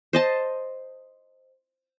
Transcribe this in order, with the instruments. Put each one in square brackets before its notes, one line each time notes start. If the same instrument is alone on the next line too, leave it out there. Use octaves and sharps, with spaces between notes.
[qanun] C5 D#5 A5